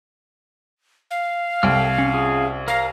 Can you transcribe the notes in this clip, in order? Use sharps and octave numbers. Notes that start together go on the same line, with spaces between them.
F5
C2 A4 G5 F6
C#4
C#4 F4 G#4
A#4 F5 A#5